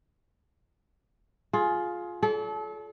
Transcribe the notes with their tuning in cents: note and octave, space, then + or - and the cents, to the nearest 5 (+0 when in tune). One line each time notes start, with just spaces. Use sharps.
F4 +10 G#4 +25
A4 -35 D5 -40